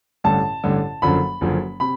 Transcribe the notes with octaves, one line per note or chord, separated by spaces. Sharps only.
A1 G2 D3 A5
A1 G2 D3
F#1 F#2 D3 F3 B5
F#1 F#2 D3 F3
C3 B5